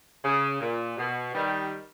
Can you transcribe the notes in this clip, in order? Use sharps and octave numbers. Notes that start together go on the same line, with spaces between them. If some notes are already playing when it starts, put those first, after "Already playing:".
C#3
A#2
B2
D#3 G3